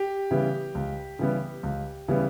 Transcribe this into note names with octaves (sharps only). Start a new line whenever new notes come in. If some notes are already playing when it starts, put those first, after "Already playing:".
Already playing: G4
C#3 E3 G3 B3
C#2
C#3 E3 G3 B3
C#2
C#3 E3 G3 B3